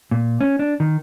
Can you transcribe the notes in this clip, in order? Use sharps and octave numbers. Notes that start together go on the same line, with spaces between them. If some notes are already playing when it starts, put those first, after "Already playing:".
A#2
C#4
D4
D#3